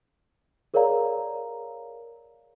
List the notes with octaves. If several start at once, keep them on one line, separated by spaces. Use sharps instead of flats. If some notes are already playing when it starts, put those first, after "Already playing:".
G#4 A#4 C#5 D5 F5 A#5